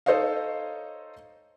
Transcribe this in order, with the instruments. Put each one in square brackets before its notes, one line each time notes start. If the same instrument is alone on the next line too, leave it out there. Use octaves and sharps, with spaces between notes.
[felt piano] D#4 A4 C5 C#5 D#5 F5